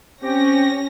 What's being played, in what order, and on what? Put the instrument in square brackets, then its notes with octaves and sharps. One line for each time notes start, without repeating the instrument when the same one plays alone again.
[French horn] C4 [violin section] C#4 A#6 [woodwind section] G4 G5